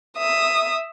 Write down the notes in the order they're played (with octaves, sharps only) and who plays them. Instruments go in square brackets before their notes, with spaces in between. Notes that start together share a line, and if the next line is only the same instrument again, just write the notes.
[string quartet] E5 D#6